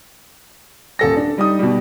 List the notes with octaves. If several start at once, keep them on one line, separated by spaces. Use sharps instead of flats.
D#1 A4 A#6
D4
G3 D#4 D#6
B2 G3